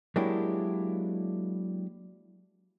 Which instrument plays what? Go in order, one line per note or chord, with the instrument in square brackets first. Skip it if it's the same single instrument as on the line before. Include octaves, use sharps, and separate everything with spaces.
[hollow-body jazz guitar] F#3 G#3 A#3 D4 E4 G4